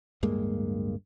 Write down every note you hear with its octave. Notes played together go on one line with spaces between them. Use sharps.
D1 G2 G#3 A#3